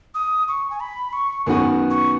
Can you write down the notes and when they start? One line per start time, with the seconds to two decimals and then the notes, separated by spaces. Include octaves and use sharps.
0.15 D#6
0.48 C#6
0.70 G#5
0.80 B5
1.13 C#6
1.46 F#2 D#3 B3 F#4 B4 C#6
1.90 C#6